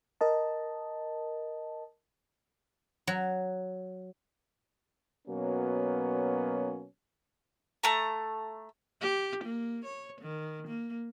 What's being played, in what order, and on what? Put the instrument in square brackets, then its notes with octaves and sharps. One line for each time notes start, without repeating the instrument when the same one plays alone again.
[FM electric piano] A#4 D#5 A5
[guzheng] F#3
[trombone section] B2 F#3 A#3 B3 C#4
[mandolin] A3 A#5
[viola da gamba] G4
A#3
C#5
D#3
A#3